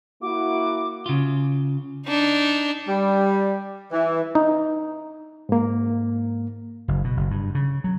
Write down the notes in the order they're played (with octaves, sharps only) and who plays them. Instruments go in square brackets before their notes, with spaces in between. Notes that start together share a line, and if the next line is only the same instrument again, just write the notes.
[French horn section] A#3 E4 F#4 [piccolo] D6
[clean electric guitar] C#3 F4
[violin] D4 D#4
[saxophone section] G3
E3
[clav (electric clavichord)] D#4
[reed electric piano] G#2 A#3
[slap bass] F#1
B2
F#1
G2
C#3
F#3